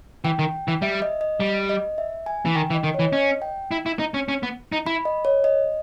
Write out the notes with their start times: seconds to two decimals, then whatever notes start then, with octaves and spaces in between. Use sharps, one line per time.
0.24 E3 G5
0.39 D#3
0.68 E3
0.82 G3 E5
1.02 D#5
1.21 D#5
1.40 G3
1.69 D#5
1.98 E5
2.26 G#5
2.45 E3
2.55 D#3 G5
2.70 E3
2.74 D#5
2.84 D#3
2.94 E3 C#5
3.13 C#4 D#5
3.42 G5
3.71 E4
3.86 E4
3.99 D#4
4.14 C#4
4.29 C#4
4.43 B3
4.72 D#4
4.86 E4 B5
5.05 D#5
5.25 C#5
5.44 D#5